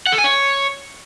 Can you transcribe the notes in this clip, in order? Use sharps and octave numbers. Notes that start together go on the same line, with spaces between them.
F#5
A4
G#5
C#5